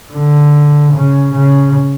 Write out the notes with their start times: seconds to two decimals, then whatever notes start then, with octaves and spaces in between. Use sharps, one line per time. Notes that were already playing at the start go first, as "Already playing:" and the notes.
0.12 D3
0.93 C#3
1.34 C#3